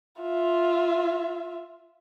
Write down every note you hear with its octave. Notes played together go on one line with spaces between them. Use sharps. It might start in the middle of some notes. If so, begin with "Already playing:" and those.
F4 E5